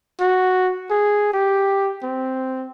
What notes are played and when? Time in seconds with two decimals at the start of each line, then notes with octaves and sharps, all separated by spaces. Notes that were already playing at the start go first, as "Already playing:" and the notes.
0.21 F#4
0.90 G#4
1.33 G4
2.03 C4